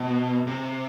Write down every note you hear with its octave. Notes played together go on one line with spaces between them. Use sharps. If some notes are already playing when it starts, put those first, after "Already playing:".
Already playing: B2
C3